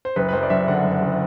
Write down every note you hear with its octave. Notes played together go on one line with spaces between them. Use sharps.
C5
F#1 B4
B4
F#2 C5
D5
F#1 E5
D3 F#5
F#2
F#1